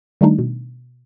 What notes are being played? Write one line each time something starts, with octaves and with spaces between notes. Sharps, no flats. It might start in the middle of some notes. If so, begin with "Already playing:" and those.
D#3 G3 A3 D4 D#4
B2